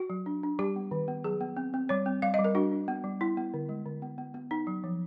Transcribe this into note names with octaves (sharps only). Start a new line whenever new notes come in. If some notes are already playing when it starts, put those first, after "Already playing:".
Already playing: F#4
F#3
D4
D4
G3 G4
B3
D#3
B3
F#3 G#4
B3
C4
C4
G3 C#5
C4
G3 F5
D#5
G3
A#4
D4 F#4
D4
B3
G3
B3 E4
B3
D3
G#3
D3
B3
B3
B3
B3 D#4
F#3
F3